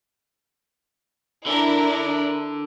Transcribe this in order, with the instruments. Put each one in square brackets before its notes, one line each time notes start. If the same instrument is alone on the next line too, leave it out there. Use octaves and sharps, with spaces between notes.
[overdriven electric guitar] D3 [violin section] D4 E4 A#4